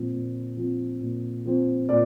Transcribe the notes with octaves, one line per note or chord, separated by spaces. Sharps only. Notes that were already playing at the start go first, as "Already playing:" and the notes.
Already playing: A#2 F3 C4
A#2
F3 C4
A#2
F3 C4
A#2 D5